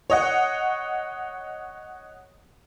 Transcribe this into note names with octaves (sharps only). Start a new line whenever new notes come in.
C#5 D#5 F#5